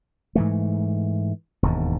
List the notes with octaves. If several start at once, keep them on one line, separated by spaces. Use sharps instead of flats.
G#2 E3 A3
E1 D#2 G#2